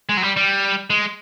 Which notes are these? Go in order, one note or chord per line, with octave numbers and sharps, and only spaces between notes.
G#3
F#3
G3
G3
G#3